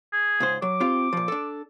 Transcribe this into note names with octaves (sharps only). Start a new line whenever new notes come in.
G#4
C#2 G#2 C5
F#3 D6
C4 F4 G4
A#2 F3
D4 A4